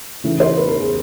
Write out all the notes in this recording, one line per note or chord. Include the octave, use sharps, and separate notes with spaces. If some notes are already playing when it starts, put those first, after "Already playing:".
C#3 E3 A3
C5
B4
A#4
G#4